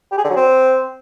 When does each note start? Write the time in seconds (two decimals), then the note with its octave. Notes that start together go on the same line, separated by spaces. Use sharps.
0.12 G4
0.18 G#4
0.24 D3
0.30 F#3
0.36 C4